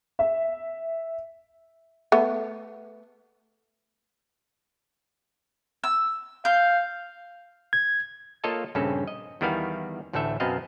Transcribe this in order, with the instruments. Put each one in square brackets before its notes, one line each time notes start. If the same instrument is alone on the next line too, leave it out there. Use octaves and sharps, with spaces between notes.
[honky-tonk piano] E5
[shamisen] A3 B3
[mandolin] E6
[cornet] F5 [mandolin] G6
[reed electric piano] G#6
[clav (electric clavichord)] A#3 F4 A4 C#5 D#5 A5
A#1 G2 C#3 C4 C#4 A4
D#5
E2 D#3 G3 B3 E4 F5
A1 D2 A2 A3 A4 E5
F#2 B2 B3 C4 D#5 F5